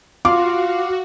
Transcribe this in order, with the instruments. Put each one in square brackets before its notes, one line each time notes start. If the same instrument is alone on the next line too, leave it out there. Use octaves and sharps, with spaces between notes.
[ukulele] F4 [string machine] F#4 [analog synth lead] F5 [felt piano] D6